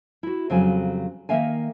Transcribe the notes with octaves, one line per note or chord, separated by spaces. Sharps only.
E4 F#4
F2 C#3 F#3 G3 C4 G#5
D#3 F#3 A#3 E5 F5 G#5